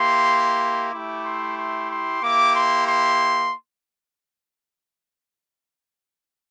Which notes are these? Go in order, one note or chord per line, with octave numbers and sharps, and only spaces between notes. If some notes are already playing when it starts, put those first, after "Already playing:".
Already playing: A#3 E4 G4 C6
A3 E4 G4 D6
C6
C6
C6
A#3 E4 G4 D6
C6
C6